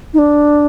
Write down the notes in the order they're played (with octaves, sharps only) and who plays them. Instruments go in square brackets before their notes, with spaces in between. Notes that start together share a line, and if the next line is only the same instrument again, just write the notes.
[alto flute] D#4
D4